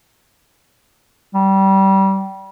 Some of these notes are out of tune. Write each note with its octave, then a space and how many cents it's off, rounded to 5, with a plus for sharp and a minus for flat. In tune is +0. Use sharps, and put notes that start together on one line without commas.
G3 -20